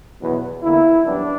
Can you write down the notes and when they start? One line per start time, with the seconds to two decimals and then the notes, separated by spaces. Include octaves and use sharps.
0.21 E2 B2 F#3 B3
0.63 E2 D3 A#3 E4
1.05 F#2 E3 G3 B3 D4